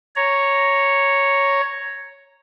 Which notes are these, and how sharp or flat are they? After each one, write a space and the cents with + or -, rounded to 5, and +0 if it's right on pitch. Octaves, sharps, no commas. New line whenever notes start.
C#5 +0 A#5 +0